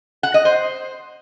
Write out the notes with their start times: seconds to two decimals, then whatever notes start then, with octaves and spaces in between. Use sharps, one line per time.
0.23 F#5
0.34 D#5
0.45 C5